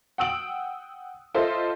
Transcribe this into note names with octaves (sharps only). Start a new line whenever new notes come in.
F#5 G5 D#6 E6 D7 F#7
F4 A4 C5 D#5 E5